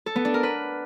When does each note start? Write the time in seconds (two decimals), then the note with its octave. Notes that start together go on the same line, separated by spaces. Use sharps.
0.06 A4
0.16 B3
0.25 D4
0.34 A#4
0.43 B4